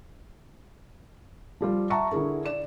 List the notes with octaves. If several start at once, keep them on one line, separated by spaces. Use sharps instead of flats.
F3 G3 F4
E5 F#5 A5 A#5 C#6
D3 E4 G#4 A#4
D5 E7